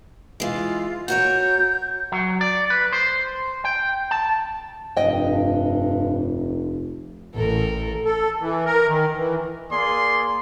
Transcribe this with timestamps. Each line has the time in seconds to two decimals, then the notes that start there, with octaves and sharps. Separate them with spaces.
0.40 E3 G#3 F4
1.08 F#4 A#4 C#5 G6
2.12 F#3
2.41 D5
2.70 B4
2.93 C5
3.65 G5
4.11 A5
4.96 F1 G2 D#5 G5
7.34 A1 A4 A#4
8.05 A4
8.40 E3
8.65 A#4
8.87 D#3
9.16 E3
9.71 A#3 G#4 D5 C6